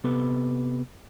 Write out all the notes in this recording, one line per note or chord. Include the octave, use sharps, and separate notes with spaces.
C3 B3 G4 A4 B4